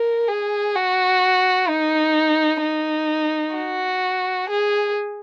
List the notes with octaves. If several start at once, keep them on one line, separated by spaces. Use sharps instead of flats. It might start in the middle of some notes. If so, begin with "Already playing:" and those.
Already playing: A#4
G#4
F#4
D#4
D#4
F#4
G#4